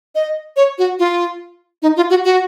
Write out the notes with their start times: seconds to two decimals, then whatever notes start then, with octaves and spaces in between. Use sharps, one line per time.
0.15 D#5
0.56 C#5
0.78 F#4
0.99 F4
1.82 D#4
1.96 F4
2.10 F#4
2.24 F#4